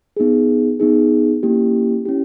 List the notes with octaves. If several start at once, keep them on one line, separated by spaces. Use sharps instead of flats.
B3 D#4 G#4
B3 D#4 G#4
A#3 C#4 E4 G4
C#4 E4 G4